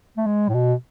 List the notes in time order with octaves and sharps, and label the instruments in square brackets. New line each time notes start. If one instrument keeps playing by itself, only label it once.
[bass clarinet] A3
G#3
A2
B2